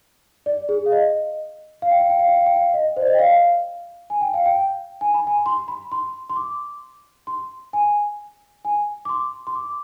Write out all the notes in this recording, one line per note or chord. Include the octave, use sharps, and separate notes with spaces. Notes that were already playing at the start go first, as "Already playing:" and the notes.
D5
G#4
F5
D#5
F5
G5
F5
G5
F5
G5
F5
G5
F5
D#5
C5
D5
D#5
G5
F5
G#5
G5
F5
G5
G#5
B5
G#5
C6
B5
C6
C6
D6
C6
G#5
G#5
D6
C6
C6
D6